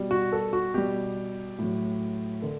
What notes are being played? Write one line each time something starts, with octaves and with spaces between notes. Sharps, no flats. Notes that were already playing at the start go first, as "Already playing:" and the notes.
Already playing: B2 G3
F#4
A4
F#4
B2 G3 G4
A2 F#3
D3 A4